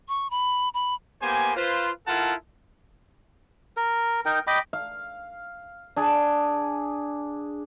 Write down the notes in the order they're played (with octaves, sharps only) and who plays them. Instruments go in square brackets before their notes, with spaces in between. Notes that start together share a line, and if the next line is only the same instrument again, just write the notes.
[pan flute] C#6
B5
B5
[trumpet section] A#3 B3 G4 C5 G#5
F4 B4 C5
E4 F4 A4 A#4 F#5 A5
[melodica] A#4
D#4 A#4 G5
D#5 G5 B5 D6
[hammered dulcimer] F5
D4 G#4